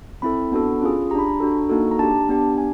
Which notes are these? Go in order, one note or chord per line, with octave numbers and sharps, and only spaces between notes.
C4 E4 A4 B5
B3 D4 F#4 A4
C#4 F4 G#4
D4 G4 A#5 B5
A#5
D4 F#4 A4
A#3 D#4 F#4 A4
A#5
D4 G4 A5
B3 D4 G4
D4 G#5